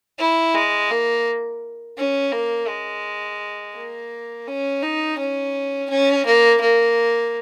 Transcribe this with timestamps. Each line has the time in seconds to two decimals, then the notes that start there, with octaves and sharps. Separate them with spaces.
0.19 E4
0.55 G#3
0.91 A#3
1.98 C#4
2.32 A#3
2.68 G#3
3.76 A#3
4.48 C#4
4.82 D#4
5.19 C#4
5.90 C#4
6.26 A#3
6.61 A#3